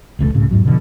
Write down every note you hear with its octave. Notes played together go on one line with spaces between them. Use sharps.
E1 C#2 B2 A3
C2 A2 C#3
E2 G#2 F#3
B2 D3 F3